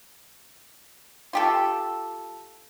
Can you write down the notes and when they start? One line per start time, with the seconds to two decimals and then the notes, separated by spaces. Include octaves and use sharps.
1.33 F4 G4 A4